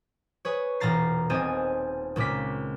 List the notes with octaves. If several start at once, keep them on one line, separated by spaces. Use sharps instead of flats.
G#4 B4 C#5
E1 A#2 A#3 A#5 A6 C7
D#1 C4 A4 D#5 G#5
C#2 A#2 A#3 D6 B6